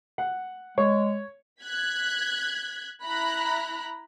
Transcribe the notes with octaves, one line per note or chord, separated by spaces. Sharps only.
F#5
G#3 C#5 C#6
F#6 G#6 B6
E4 A#5 B5 F#6